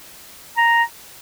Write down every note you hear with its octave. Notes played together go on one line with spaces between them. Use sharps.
A#5